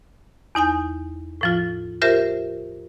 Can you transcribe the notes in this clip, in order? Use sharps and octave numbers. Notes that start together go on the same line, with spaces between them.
E2 D#4 G#5 G6
A2 F3 F4
F4 G4 A#4 C5 E5